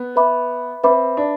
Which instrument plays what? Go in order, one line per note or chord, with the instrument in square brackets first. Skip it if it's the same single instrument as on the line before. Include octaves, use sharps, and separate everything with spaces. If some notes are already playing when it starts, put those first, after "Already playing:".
Already playing: [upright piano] B3
[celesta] B4 E5 B5 D6
[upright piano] C4 [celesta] B4 E5 B5 D6
[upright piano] D4